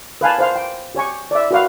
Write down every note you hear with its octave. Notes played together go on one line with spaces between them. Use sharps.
B4 F5 G#5 A5
C5 F5 C6
G5
G4 C#5 G#5 C#6
D5 E5
F#4 B4 F5